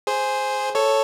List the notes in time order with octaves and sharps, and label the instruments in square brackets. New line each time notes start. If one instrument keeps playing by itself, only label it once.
[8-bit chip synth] G#4 C5
A4 C#5